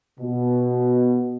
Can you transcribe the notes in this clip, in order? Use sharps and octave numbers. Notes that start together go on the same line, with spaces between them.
B2